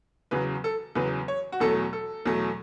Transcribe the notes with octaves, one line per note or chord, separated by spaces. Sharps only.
E2 C#3 F#3 B4
A4
E2 C#3 F#3 B4
C#5
F#4
E2 B2 F#3 A3 A4
A4
E2 B2 F#3 A3